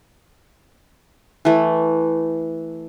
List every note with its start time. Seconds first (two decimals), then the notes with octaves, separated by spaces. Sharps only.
1.45 E3 A3